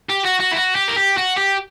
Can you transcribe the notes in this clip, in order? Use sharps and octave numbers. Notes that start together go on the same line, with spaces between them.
G4
F#4
F#4
E4
F#4
G4
A#4
G4
F#4
G4